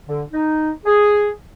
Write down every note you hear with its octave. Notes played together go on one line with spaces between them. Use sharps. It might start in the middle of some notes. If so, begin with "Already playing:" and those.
D3
D#4
G#4